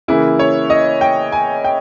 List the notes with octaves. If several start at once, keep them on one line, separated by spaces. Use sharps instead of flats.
C#3 E3 A#3 E4
C#5
D#5
G5
G#5
G5